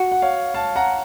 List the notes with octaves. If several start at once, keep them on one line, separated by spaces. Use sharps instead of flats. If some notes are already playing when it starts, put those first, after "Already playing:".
Already playing: F#4
F#5
C#5 F5
F5 A5
F#5 A#5